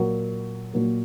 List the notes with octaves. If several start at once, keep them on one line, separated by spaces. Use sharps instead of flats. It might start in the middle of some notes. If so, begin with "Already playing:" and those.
Already playing: A#2 F#3 A#3
A#2 F#3 A#3